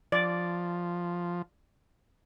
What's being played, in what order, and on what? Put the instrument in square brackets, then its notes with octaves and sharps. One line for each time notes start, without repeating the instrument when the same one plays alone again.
[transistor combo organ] F3 [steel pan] D5